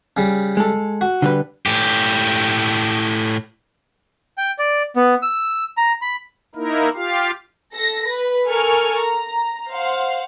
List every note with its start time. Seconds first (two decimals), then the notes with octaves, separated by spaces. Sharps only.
0.17 C#3 G3
0.57 G#3 A4
1.01 F#4
1.22 D3 G3 B4
1.66 A2 G4
4.38 G5
4.59 D5
4.96 B3
5.22 E6
5.77 A#5
6.02 B5
6.55 A#3 D#4 E4 A#4
6.95 F4 G4 F5
7.75 A4 A#6
8.08 B4
8.48 A4 A#4 G#5 C#6 F6
8.99 A#5
9.71 C5 F5 F#5